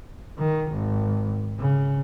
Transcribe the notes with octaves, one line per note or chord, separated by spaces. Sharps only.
D#3
G#1
C#3